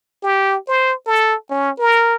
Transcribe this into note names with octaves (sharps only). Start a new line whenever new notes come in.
G4
C5
A4
C#4
A#4